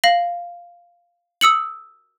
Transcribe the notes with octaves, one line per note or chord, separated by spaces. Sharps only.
F5 A#6 F#7
D#6 E6 C#7 F#7